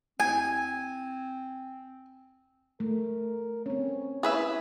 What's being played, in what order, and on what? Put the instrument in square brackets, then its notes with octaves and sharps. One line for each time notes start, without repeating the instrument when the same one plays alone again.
[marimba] E2 [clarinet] C4 [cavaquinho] G#5
[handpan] A3 [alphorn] A#4
[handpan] C4 C#4 [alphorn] C#5
[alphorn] E4 [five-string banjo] G#4 B4 E5